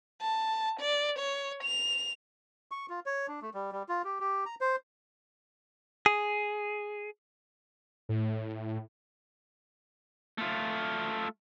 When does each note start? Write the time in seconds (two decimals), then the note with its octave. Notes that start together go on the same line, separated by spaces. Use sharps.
0.22 A5
0.80 D5
1.19 C#5
1.64 F7
2.71 C#6
2.89 F4
3.06 C#5
3.28 D4
3.42 A3
3.54 G3
3.72 G3
3.89 F4
4.04 G4
4.20 G4
4.46 A#5
4.61 C5
6.06 G#4
8.09 A2
10.38 A3 F4